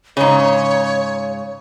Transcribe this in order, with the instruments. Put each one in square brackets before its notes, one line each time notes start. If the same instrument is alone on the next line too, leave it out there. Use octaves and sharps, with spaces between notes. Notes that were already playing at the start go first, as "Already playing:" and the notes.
[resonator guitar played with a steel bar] G#2 C#3 [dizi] C#5